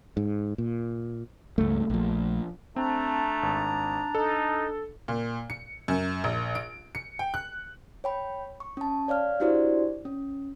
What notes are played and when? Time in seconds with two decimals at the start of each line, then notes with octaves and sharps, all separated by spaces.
0.17 G#2
0.58 A#2
1.58 C#2 G2 A3
1.90 A#1 F3
2.76 A3 C4 D4 A#5
3.43 G#1
4.15 D#4 A4
5.08 A#2
5.50 C#7
5.88 F#2
6.24 A#1
6.55 D7
6.95 C#7
7.19 G5
7.34 F#6
8.04 C#5 G5 B5
8.60 C#6
8.77 C#4 A5
9.08 C#5 D5 F5 F6
9.40 D4 E4 F#4 G4 C5 D5
10.05 C#4